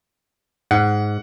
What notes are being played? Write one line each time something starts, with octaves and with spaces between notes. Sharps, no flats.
G#2 F#5